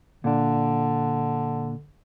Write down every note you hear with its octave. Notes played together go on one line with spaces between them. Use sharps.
A#2 D3 D4